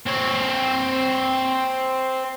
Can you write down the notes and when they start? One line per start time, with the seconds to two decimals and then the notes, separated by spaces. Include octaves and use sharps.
0.07 C4 C#5